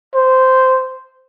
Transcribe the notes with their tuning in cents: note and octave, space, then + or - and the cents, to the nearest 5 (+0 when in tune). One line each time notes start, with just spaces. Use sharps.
C5 -10